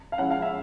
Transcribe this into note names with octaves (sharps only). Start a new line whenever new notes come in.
F5
F3 G#3 C#4 E4 F#5
F5
E5